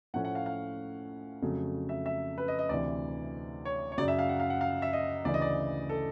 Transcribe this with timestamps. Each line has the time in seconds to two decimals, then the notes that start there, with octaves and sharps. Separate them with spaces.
0.14 A2 F3 A3 C#4 F#5
0.25 F#5
0.35 F5
0.46 F5
1.42 F2 C#3 F#3 A3
1.89 E5
2.06 E5
2.38 B4
2.48 D#5
2.59 D#5
2.69 D2 C3 E3 D5
3.65 C#5
3.92 C#5
3.97 F#2 C#3 F#3 D5
4.08 E5
4.19 F5
4.29 F#5
4.40 F5
4.50 F#5
4.61 F5
4.82 E5
4.93 D#5
5.25 D2 C#3 E3 D5
5.34 D#5
5.42 D5
5.89 A4